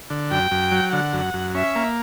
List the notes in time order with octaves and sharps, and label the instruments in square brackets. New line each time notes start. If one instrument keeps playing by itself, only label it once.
[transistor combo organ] D3
[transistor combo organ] F#2 [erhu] G5
[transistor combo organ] F#2
F#3
[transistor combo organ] D3 [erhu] F#5
[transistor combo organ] F#2
F#2
[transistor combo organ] C#4 [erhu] E5
[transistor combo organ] A#3